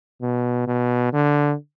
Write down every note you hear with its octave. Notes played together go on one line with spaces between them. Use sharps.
B2
B2
D3